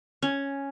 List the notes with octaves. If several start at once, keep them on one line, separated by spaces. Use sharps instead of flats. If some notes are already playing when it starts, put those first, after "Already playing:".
C#4